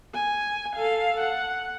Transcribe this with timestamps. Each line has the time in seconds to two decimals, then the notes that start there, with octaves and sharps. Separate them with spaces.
0.14 G#5
0.75 A4 F5
1.20 F#5